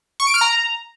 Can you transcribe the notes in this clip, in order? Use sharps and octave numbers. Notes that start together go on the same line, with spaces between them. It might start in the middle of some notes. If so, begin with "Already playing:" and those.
C#6
D7
F6
A#5